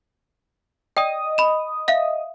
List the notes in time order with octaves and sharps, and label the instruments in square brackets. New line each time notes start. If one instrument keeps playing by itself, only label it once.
[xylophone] D5 G5 [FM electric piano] D#5 D#6
[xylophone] B5 E7
E5 F5